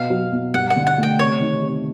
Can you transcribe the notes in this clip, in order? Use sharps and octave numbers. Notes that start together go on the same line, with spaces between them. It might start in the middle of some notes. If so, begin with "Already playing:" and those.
Already playing: B2 F5
F#3
B2
G2 F#5
F#5
D3
F#5
A3 G5
C3 C#5
D#3
C3